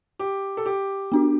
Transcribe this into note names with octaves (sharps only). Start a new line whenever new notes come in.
G4
A4
G4
B3 D4 F#4